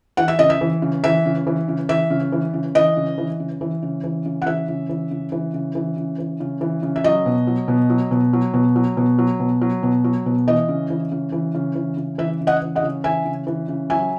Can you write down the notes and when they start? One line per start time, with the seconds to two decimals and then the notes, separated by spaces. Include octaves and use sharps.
0.17 E3 F#5
0.28 E5
0.39 C#3 D#5
0.50 E5
0.61 E3
0.82 C#3
1.04 E3 E5
1.25 C#3
1.47 E3
1.68 C#3
1.89 E3 E5
2.10 C#3
2.32 E3
2.53 C#3
2.75 E3 D#5
2.97 C#3
3.18 E3
3.40 C#3
3.61 E3
3.83 C#3
4.04 E3
4.26 C#3
4.42 F#5
4.46 E3 E5
4.68 C#3
4.89 E3
5.11 C#3
5.32 E3
5.54 C#3
5.75 E3
5.97 C#3
6.19 E3
6.40 C#3
6.61 E3
6.83 C#3
6.96 E5
7.04 F#3 D#5
7.26 B2
7.47 F#3
7.68 B2
7.90 F#3
8.11 B2
8.33 F#3
8.54 B2
8.76 F#3
8.97 B2
9.19 F#3
9.40 B2
9.61 F#3
9.83 B2
10.04 F#3
10.26 B2
10.47 E3 D#5
10.69 C#3
10.90 E3
11.12 C#3
11.32 E3
11.54 C#3
11.75 E3
11.97 C#3
12.18 E3 E5
12.41 C#3
12.47 D#5 F#5
12.62 E3
12.76 D#5 F#5
12.82 C#3
13.04 E3 E5 G#5
13.25 C#3
13.47 E3
13.68 C#3
13.90 F#3 E5 G#5